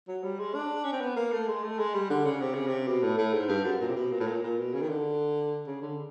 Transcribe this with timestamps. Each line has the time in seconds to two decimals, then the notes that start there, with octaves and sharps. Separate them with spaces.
0.08 F#3
0.24 G3
0.39 G#3
0.55 D4
0.84 C#4
0.92 C4
1.01 B3
1.16 A#3
1.32 A3
1.48 G#3
1.64 A3
1.79 G#3
1.94 G3
2.10 D3
2.25 C#3
2.41 C3
2.54 C#3
2.67 C3
2.87 B2
3.03 A2
3.18 A2
3.33 G#2
3.49 G2
3.64 F#2
3.81 A#2
3.89 C3
3.96 B2
4.12 A#2
4.20 A2
4.27 A#2
4.43 A#2
4.58 B2
4.73 C#3
4.82 D#3
4.89 D3
5.67 C#3
5.82 D3